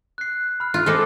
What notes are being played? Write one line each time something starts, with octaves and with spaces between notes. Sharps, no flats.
F#6 C7
B5 F6
F4
G#3 C4 A4 D6 C7